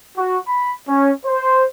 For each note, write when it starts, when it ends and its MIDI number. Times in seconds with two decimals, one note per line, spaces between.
0.17 0.38 66
0.48 0.73 83
0.88 1.12 61
1.25 1.65 72